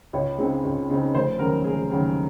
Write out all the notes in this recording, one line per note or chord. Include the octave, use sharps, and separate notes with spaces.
C#2 C#5
C#3 G#3 C4 D#4
C#2
C#3 G#3 C4 D#4
F1 C5
D#2 C#3 F#3 A#4
F1 G#4
D#2 C#3 F#3